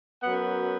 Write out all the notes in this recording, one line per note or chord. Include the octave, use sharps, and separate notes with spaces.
F#2 F#3 B3 F#5